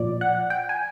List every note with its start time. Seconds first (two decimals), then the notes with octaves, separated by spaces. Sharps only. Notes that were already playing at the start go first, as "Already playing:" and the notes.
Already playing: A#2 F3 D5
0.21 F#5
0.50 G5
0.69 G#5